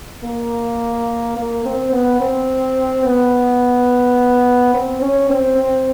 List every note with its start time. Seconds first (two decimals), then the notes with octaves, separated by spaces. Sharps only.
0.24 A#3
1.37 A#3
1.65 C4
1.93 B3
2.21 C4
3.05 B3
4.74 C4
5.02 C#4
5.30 C4
5.58 C4